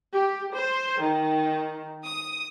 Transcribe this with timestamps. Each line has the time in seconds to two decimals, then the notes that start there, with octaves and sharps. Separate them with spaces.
0.13 G4
0.54 C5
0.99 D#3
2.04 D#6